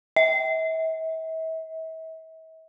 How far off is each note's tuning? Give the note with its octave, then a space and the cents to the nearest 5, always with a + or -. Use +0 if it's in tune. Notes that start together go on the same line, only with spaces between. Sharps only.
E5 -40